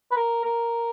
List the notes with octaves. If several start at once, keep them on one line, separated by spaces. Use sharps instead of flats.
B4
A#4
A#4